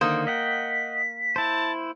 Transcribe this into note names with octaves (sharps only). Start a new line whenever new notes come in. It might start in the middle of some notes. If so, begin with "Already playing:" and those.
D3 D#3 A#3 C5 D#6
D#5 F#5 G5 B6
E4 C5 A5